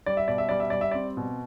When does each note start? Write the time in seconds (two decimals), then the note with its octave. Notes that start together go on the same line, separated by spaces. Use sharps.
0.06 G3 D5
0.17 E5
0.28 B2 D5
0.38 E5
0.49 G3 D5
0.60 E5
0.70 G3 D5
0.81 E5
0.91 C4 D5
1.17 B2